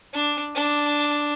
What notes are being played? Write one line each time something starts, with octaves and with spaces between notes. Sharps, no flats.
D4
D4